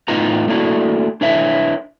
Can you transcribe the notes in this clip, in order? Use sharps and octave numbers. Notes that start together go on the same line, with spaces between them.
A2 B3 D#4 F4 B4 A#5
A3 A#3 D4 E4 F#4
D4 E4 B4 C#5 E5